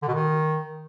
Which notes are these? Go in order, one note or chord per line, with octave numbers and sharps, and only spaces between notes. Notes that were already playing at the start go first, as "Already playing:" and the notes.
D3
B2
D#3